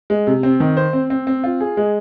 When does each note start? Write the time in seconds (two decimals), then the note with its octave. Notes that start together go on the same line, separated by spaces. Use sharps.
0.10 G#3
0.27 C3
0.43 C4
0.60 D#3
0.77 C5
0.93 C4
1.10 C4
1.27 C4
1.44 F4
1.61 G#4
1.77 G#3